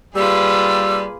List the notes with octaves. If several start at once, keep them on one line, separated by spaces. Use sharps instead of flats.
G3 A#3 F4 G#4 B4 E6